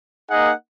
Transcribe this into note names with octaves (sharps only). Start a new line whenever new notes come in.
A#3 D#4 G#4 D#5 F#5